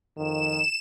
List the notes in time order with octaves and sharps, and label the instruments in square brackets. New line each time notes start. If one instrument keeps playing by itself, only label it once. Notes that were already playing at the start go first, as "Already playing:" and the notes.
[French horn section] F2 D#3 [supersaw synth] E7